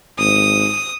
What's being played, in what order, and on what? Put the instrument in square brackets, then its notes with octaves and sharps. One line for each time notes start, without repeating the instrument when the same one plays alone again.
[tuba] G#1 [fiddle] D#6